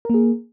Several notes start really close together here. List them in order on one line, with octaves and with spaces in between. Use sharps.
A#4 A#3 G#4